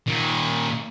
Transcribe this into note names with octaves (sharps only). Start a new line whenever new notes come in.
A#2 D#3